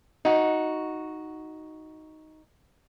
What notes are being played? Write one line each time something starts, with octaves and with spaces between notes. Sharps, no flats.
D#4 F#4